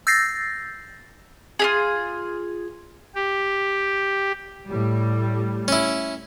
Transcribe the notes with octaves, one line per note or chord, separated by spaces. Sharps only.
E6 G6 A6 A#6 C7
F4 G4 G#4
G4
A2 G3
C#4 E4